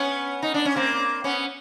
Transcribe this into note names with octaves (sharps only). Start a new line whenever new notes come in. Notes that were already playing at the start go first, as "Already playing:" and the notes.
Already playing: B3 C#4
D#4
D4
C#4
A#3 C4
B3 C#4